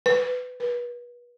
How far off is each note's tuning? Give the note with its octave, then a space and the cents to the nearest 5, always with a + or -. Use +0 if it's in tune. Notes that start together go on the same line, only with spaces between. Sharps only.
B4 +20
B4 -35